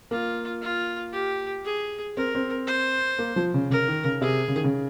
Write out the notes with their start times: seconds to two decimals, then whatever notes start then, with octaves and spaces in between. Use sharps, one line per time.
0.11 A#3 F4
0.62 F4
1.13 G4
1.65 G#4
2.17 C4 A#4
2.35 C4
2.67 C5
3.19 A#3
3.36 F3
3.54 C#3
3.70 C#3 A#4
3.88 D#3
4.04 C#3
4.21 C3 G#4
4.48 C#3
4.56 D#3
4.64 C#3